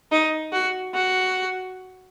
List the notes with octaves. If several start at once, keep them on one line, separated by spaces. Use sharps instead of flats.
D#4
F#4
F#4